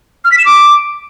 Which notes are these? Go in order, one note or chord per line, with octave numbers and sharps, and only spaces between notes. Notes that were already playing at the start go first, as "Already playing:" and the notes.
F6
B6
E7
D6